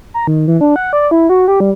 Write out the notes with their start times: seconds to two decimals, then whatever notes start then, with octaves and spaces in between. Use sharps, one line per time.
0.14 A#5
0.27 D#3
0.48 E3
0.61 D4
0.76 F#5
0.93 D5
1.11 E4
1.29 F#4
1.48 G4
1.60 G3